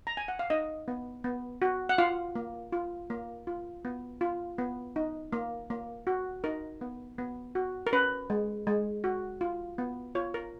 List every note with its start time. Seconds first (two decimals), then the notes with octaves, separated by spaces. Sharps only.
0.07 A#5
0.17 G#5
0.28 F#5
0.39 F5
0.50 D#4 D#5
0.88 B3
1.24 B3
1.62 F#4
1.89 F#5
1.98 F4 F5
2.35 A#3
2.72 F4
3.10 A#3
3.47 F4
3.85 B3
4.21 F4
4.58 B3
4.96 D#4
5.33 A#3
5.70 A#3
6.07 F#4
6.44 D#4 A#4
6.81 B3
7.18 B3
7.55 F#4
7.87 A#4
7.93 C#4 B4
8.30 G#3
8.67 G#3
9.04 F#4
9.41 F4
9.78 B3
10.15 F4 C#5
10.34 A#4